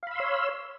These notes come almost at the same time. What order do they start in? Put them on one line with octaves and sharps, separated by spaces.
F5 B5 E6 C6 C#5